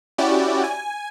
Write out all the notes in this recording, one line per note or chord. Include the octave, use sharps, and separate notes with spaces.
C#4 E4 F#4 G4 D5
G#5